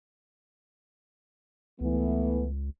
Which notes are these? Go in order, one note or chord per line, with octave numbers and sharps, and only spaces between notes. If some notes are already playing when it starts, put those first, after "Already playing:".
C#2 E3 A3 B3